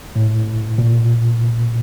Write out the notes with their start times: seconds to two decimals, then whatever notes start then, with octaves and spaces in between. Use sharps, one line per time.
0.15 A2
0.78 A#2